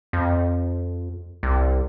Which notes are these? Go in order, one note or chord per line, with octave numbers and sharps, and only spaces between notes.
F2
C2